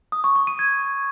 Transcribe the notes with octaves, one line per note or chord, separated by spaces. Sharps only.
D#6
C#6
C#6
D#7
G#6